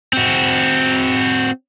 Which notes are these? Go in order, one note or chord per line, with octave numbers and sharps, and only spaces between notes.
C4 F#4